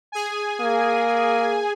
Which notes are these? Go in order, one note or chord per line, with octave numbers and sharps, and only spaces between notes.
G#4 G#5
A#3